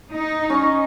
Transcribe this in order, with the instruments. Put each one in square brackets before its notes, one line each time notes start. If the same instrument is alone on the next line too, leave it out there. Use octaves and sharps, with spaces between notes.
[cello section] D#4
[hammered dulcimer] C#4 D#5 C#6